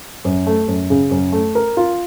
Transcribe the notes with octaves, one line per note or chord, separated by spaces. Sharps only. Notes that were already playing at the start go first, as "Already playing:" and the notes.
F#2
A3
F#2
C#3
F#2
A3
A#4
F4